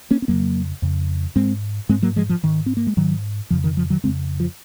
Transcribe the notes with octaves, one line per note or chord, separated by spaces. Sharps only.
A#3 C#4
C4
F2 C#3 F#3 A#3
F2 C#3
G#2 G#3 C4
G#2 G#3 C4
F#3 A#3
F3 G#3
F3
G#2 D#3
C4
A#3
G#3
G#2 D#3 F#3
F2 C#3 F3
D#3
F3
D#3 F#3
F2 C#3 G#3 C4
F3